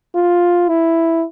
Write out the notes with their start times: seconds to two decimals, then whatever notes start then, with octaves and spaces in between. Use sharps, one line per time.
0.15 F4
0.69 E4